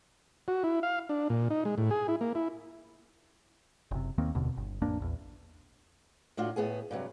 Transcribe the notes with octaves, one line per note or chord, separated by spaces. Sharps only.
F#4
E4
F5
D4
A#2
D#4
G#3
A2
G#4
E4
A#3
E4
F#1 C3
D#2 D#3 A#3 C4
F1 D#2 B2 D3
G1
A1 F2 A#3 D4
A#1 E2
A2 D4 F4 F#4
A2 B3 G#4 G#5
G2 C3 F#3